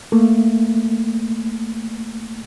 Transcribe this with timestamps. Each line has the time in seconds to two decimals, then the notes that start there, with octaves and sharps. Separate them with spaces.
0.12 A3 A#3